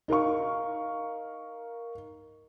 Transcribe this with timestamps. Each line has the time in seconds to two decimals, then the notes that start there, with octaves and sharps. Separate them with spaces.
0.08 D#4 A#4 F5 C#6